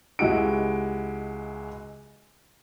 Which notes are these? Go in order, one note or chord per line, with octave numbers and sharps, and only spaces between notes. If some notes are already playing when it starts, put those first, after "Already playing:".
C#2 G#3 E4 F#4 G4 D7